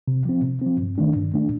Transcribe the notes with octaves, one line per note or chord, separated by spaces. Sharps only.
C3
F3 C4
C3
F3 C4
G2
D#3 A3 D4
G2
D#3 A3 D4